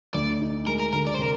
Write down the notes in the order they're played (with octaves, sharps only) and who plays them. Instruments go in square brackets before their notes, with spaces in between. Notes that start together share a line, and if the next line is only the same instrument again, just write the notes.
[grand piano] D2 [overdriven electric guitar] D5
[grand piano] D#4
[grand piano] G#3 [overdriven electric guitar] A#4
[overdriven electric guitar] A#4
[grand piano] D3 [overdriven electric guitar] A#4
[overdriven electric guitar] D5
C5
[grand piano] C3 [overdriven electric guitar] A#4